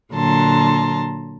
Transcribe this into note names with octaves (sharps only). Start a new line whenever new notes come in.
A#2 D3 F#3 A5 A#5 C6